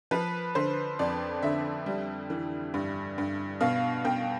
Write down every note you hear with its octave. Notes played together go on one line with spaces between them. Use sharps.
F3 B4
D3 C5
F2 D5
D3 E5
G3
E3
G2
G2
B2 F5
B2 G5